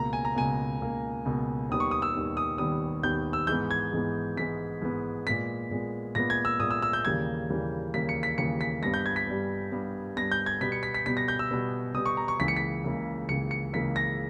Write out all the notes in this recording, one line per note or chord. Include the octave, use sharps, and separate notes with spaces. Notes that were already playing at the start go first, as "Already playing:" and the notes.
Already playing: C#2 B2 A#3 A#5
G#5
A#5
C#2 B2 A#3 G#5
C#2 B2 A#3
C#2 B2 A#3
D#2 D#3 G3 B3 D#6
C#6
D#6
E6
D#2 D#3 G3 B3
D#6
D#2 D#3 G3 B3 D#6
D#2 D#3 G3 B3 G6
E6
G#2 E3 G#3 B3 G6
G#6
G#2 E3 G#3 B3
G#2 E3 G#3 B3 B6
G#2 E3 G#3 B3
A#2 G#3 B3 B6
A#2 G#3 B3
A#2 G#3 B3 A#6
G#6
E6
A#2 G#3 B3 D#6
E6
E6
G6
D#2 C#3 E3 G3 A#3 G#6
D#2 C#3 E3 G3 A#3
D#2 C#3 E3 G3 A#3 B6
C#7
B6
D#2 C#3 E3 G3 A#3 C#7
B6
G2 G3 B3 A#6
G6
G#6
B6
G2 G3 B3
G2 G3 B3
G2 G3 B3 A#6
G6
G#6
B2 G3 B3 B6
C#7
B6
B6
B2 G3 B3 B6
A#6
G6
E6
B2 G3 B3
B2 G3 B3 D#6
C#6
A#5
C#6
C#2 C#3 E3 A#3 B6
C#7
B6
C#2 C#3 E3 A#3
C#2 C#3 E3 A#3 C#7
C#7
C#2 C#3 E3 A#3 B6
A#6